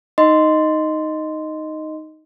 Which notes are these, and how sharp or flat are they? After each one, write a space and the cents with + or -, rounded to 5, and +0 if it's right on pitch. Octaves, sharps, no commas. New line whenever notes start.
D#4 +0 D#5 +0 C6 -10